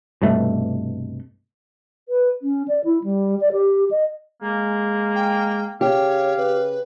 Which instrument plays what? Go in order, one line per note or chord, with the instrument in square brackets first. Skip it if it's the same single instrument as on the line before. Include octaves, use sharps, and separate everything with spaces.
[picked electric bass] C2 G2 B2 A3
[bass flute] B4
C#4
D5
E4
G3
D5
G4
D#5
[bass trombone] G#3 [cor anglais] A#3
[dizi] G5
[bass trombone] C#3 [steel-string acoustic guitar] G4 [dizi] C#5 [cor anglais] F5
[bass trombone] C#3 [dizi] B4